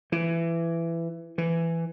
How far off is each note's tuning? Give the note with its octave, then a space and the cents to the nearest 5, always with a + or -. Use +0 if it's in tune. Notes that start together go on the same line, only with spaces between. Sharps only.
E3 +20
E3 +15